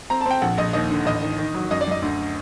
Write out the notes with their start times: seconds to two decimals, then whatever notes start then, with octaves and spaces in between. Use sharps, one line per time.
0.10 C4 A#5
0.21 A5
0.26 C4 G5
0.42 A#1 F#5
0.58 A#1 D#5
0.73 D#2 D#5
0.91 D3
1.06 A1 D#5
1.22 D#3
1.39 D#3
1.55 F#3
1.71 F#2 D#5
1.81 D5
1.87 F#2 D#5
2.02 D2